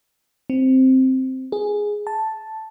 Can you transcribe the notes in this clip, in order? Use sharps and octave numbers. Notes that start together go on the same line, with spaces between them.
C4
G#4
A5